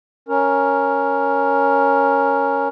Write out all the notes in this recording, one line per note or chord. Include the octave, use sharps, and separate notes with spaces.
C#4 A#4